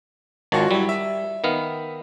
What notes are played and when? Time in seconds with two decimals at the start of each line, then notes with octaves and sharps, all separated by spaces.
0.52 G#1 D#3 F4 F#4 C#5 A5
0.71 F#3 G3 E4
0.89 E5
1.44 D#3 B3 F5